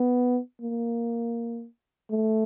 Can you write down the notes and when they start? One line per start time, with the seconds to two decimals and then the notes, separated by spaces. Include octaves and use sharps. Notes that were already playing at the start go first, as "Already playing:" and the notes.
Already playing: B3
0.61 A#3
2.10 A3